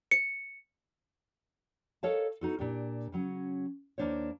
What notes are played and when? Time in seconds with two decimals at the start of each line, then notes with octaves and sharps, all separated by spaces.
0.11 C#7
2.03 A4 A#4 C#5 D#5 F5 A5
2.41 B3 D#4 F#4 A4
2.59 A#2 D4 G4
3.12 C#3 F#3 C#4
3.98 D#2 A#3 C#4 D4 C5 C#5